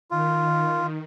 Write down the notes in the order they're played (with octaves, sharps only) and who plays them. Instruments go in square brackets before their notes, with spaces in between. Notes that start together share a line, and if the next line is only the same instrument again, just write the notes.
[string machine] D#3 [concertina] F4